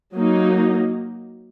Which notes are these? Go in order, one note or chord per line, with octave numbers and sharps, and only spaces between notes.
F#3 A#3 D#4